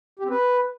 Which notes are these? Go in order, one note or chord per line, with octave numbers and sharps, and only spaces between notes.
G4
C4
B4